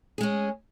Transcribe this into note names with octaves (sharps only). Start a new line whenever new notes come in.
G#3 C#4 G#4